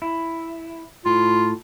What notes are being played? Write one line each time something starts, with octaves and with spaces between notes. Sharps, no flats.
E4
A2 F4